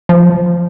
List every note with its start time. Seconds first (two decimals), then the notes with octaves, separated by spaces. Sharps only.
0.09 F3